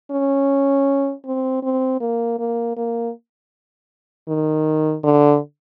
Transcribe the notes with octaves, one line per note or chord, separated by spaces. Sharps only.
C#4
C4
C4
A#3
A#3
A#3
D#3
D3